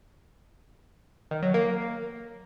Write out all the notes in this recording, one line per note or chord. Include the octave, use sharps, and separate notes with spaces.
D#3
F#3
A#3